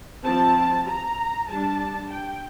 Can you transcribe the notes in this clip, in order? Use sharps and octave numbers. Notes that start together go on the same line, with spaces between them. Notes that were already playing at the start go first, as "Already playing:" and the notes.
F3 C4 A5
A#5
G3 D4 A5
G5